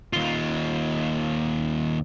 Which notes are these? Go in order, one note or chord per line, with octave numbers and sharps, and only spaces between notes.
D#2 F4